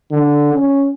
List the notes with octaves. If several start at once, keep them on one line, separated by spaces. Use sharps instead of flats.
D3
C#4